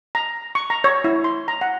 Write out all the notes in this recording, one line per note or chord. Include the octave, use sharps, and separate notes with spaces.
A#5
C#6
A#5
C#5
E4
C6
A#5
F#5